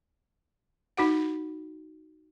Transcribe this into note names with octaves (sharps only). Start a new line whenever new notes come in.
D#4 F#4 F#5